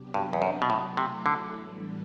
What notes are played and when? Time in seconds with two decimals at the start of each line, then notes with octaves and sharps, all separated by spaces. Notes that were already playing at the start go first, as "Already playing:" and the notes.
Already playing: C3 F#3 B3 D4 G4
0.14 G2
0.33 E2
0.42 F#2
0.62 B2
0.69 A2 F#3 A3 E4 A4
0.97 C3
1.26 D3
1.53 A2 E3 G3 B3 D4